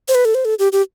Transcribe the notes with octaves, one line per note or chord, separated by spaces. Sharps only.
C5
B4
A4
C5
A4
G4
G4